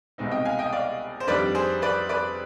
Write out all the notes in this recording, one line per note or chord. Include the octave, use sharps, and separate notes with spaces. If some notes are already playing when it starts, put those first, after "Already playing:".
C2 B2 G#3 C4 D#4
D#5 G5
F5 G#5
D#5 G5
D5 F5
C5
F2 D#3 G3 D4 B4 D5
G#4 C5
B4 D5
B4 D5